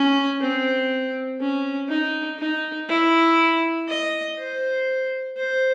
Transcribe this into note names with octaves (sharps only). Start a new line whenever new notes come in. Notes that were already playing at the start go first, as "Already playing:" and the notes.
Already playing: C#4
C4
C#4
D#4
D#4
E4
D#5
C5
C5